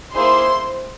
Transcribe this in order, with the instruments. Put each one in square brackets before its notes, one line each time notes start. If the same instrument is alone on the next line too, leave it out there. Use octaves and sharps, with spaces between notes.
[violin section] A#3 E4 G#4 C5 C6